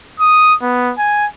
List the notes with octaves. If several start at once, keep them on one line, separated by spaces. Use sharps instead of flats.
D#6
B3
G#5